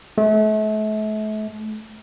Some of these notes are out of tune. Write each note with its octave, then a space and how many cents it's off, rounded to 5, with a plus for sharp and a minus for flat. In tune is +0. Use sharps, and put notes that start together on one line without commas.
A3 -40